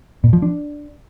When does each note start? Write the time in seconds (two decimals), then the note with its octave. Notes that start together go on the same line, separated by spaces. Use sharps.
0.24 A#2
0.33 F3
0.42 D4